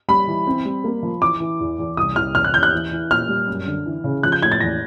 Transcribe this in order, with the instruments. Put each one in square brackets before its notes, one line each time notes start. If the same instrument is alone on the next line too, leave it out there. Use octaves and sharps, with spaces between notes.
[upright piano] G3 [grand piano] B5
[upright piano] E3
C4
G3
A#3
F3
[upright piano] E3 [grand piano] D6
[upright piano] E3
E2
E2
[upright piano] C2 [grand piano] D#6
[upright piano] C2 [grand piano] F6
[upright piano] E2 [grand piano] F6
[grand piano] F#6
[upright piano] E2 [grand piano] G6
[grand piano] F#6
[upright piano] E3
E3
[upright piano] A#2 [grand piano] F6
[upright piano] G3
F#2
D3
E3
C#3
[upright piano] F3 [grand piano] F#6
[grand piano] G6
[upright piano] A2 [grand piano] G#6
[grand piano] A6
[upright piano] E2 [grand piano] A#6